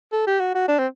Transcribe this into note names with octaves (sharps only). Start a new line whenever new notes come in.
A4
G4
F#4
F#4
D4
C4